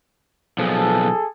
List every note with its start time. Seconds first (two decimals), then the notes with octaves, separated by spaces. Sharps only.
0.59 B1 F3 G#4 A4